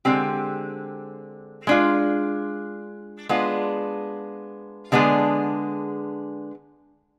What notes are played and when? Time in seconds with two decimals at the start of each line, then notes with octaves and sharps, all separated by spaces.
0.05 D3 G#3 C4 G4
1.67 G#3 D4 F4
3.29 G#3 B3 D4 F4
4.92 D3 G#3 B3 D4 G#4